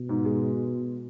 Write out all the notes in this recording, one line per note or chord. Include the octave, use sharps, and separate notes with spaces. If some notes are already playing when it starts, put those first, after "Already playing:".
Already playing: B2
G#2
G#3